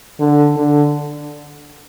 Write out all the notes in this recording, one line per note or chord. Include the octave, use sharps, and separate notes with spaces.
D3
D3